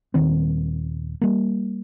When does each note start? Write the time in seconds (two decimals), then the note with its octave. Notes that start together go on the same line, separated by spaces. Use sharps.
0.14 D#1 D#2 D#3 C4
1.21 G3 A#3